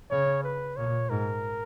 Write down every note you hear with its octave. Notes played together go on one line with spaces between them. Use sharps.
C#3 C#5
B4
A#2 C#5
G#2 A#4